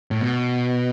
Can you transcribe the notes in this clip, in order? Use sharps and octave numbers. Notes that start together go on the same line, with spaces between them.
A2
B2